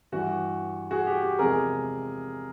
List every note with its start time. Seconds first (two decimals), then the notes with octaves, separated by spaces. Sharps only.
0.12 G2 E3 G3 F#4
0.91 F#4 G#4
1.07 G4
1.23 G4
1.39 E2 C3 F3 G#3 G#4 A#4